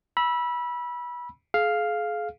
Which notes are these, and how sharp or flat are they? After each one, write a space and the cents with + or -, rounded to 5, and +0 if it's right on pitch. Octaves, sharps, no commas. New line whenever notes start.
B5 -25 E6 +0
G#4 +35 F5 +0